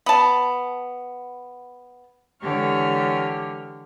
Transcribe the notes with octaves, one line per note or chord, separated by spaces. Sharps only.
B3 A5
D3 E3 G#3 G4 C#5 F6